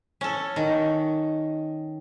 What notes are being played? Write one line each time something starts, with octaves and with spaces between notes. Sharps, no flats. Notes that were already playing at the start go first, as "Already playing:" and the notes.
C#4 A4
D#3